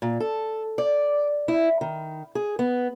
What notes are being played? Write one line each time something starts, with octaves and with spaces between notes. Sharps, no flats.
A#2
A4
D5
E4
D#3
G#4
B3